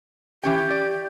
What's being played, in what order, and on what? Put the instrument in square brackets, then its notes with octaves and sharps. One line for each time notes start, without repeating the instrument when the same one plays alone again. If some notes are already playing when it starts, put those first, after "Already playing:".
[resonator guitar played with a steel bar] E3 C#4 G5 [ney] G4
[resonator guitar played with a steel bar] D5